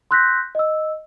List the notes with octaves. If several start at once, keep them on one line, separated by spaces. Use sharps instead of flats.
C6 E6 F#6 G6 A#6 B6
D#5 E6